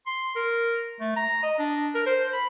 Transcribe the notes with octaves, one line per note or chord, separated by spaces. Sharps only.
C6
A#4
A3
A#5
D#5
D4
A#4
C5
B5